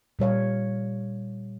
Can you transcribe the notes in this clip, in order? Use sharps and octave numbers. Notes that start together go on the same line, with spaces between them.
A#2 G3 C#5 F5